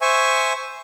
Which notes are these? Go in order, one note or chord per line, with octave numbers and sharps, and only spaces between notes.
C5 E5 G#5 C#6